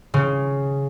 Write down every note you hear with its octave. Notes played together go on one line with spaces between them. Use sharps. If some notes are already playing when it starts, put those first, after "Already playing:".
C#3